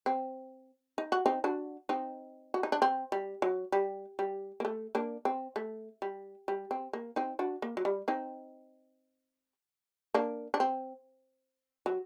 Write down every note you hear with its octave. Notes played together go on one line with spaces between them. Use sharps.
C4
D#4
F#4
C4 D#4
D4 F#4
C4 D#4
F#4
D#4
D4
C4
G3
F#3
G3
G3
A#3
A3
A#3 D4
C4
A3
G3
G3
C4
A#3
C4 D#4
D4 F#4
A#3
F#3
G3
C4 D#4
A#3 D4
D4
C4
F#3